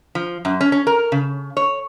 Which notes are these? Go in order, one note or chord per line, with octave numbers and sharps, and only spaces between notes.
F3
F#2
C#4
C#4
A#4
C#3
C#5